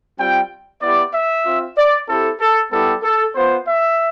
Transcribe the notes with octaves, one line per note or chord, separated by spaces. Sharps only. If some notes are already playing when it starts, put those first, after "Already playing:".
G3 C4 F4 G5
B3 E4 G4 D5
E5
C4 F4
D5
C4 E4 G4 A4
A4
G3 B3 E4 G4 A4
A4
B3 F4 C5
E5